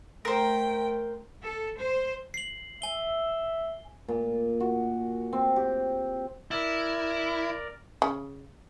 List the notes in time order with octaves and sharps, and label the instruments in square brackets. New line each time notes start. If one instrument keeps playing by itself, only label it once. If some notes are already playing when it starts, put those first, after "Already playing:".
[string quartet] A3 G5 [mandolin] A#4 C5
[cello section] A4
C5
[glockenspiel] C7 F#7
[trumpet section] E5 [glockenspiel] G#5 G7
[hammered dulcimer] A#2
F#4
C4
G4
[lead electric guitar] E4 [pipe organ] A#4 D5
[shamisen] C#3